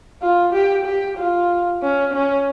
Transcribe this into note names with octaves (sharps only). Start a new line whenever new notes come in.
F4
G4
G4
F4
C#4
C#4